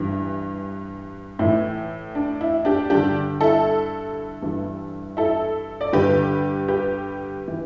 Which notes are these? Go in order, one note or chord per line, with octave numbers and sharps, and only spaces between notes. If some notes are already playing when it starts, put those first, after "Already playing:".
Already playing: G2 E3
A2 E3 E4
D4
E4
D4 G4
G2 D3 D4 G4
E4 A4
G2 E3
E4 A4
D5
G2 D3 G4 B4
G4 B4
E3